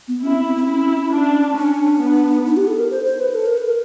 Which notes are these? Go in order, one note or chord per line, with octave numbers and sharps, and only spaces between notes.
B3
C#4 E4
C4
C4
C4
C#4 E4
D4
C#4 D4
B3
D#4
G4
A4
A#4
C5
C5
B4
A4
A#4
B4
A#4